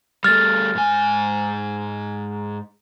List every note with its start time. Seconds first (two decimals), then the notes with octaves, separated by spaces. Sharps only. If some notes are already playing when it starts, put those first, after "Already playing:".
0.24 G3 A3 F6 A6
0.75 G#2 G#5